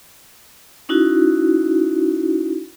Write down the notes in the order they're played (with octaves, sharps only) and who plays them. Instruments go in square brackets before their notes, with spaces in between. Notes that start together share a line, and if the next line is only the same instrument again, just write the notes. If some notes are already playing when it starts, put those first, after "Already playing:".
[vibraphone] C#4 D#4 E4 F#4